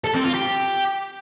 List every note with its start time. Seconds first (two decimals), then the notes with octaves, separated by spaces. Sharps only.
0.04 A4
0.14 C4
0.24 F4
0.34 G4